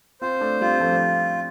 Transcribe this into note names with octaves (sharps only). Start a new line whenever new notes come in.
C4 F4 C5
A3 D4
G3 C4 F4
F3 A3
G3